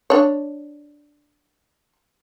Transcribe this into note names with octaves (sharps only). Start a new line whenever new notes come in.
D4 C#5